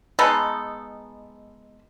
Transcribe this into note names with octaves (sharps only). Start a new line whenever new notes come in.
G#3 B3 D#4 A4